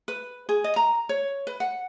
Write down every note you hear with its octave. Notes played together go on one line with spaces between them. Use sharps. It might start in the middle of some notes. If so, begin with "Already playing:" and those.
B4
G#4
D#5
A#5
C#5
B4
F#5